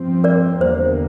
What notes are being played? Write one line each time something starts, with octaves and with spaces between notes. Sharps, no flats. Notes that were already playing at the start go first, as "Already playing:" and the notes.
Already playing: G2 F3 C4
A#4 D5
E2 D3 G3 A#3 C5